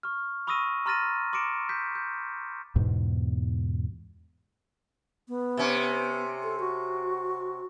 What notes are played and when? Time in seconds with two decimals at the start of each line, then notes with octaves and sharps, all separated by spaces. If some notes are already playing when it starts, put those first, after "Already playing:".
0.03 C#6 F6
0.47 B5 C#6 D#6 E6 A#6 D#7
0.86 A#5 C6 F6 A6 A#6 D#7
1.33 C6 D6 A#6 C#7 D7 E7
1.69 G6 B6
1.95 G6
2.76 E2 G#2 B2
5.28 B3
5.57 C3 C#4
6.43 A4
6.60 F#4